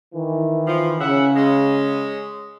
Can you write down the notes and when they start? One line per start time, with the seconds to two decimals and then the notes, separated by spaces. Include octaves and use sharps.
0.14 D#3 E3
0.67 F3
1.00 C#3 E5 F#5
1.36 G#3 C#4